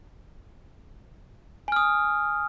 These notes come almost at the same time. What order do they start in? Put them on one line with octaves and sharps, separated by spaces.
G#5 F6 D#6